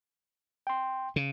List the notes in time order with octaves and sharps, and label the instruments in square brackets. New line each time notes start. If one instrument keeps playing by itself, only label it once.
[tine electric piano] G5 C6
[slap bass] C#3